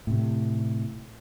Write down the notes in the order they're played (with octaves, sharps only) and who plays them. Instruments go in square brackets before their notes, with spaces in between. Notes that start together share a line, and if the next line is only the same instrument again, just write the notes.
[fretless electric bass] A2 C3